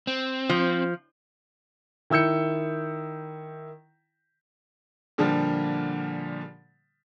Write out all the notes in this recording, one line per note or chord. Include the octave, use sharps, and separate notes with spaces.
C4
F3
D#3 E4 E6 G6 C#7
A#2 D3 F3 G3